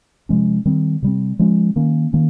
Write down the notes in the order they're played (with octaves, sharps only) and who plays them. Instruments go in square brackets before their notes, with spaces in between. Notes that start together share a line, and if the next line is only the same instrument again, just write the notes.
[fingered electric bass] C3 F3 G#3 C#4
D#3 G3 C4
C3 G3 C4
F3 G#3 C#4
D#3 A#3 C#4
D#3 A#3 C#4